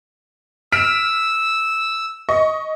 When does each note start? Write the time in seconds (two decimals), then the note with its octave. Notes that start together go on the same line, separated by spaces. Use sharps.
0.72 E6 F6 B6 D7
2.29 D#5 C#6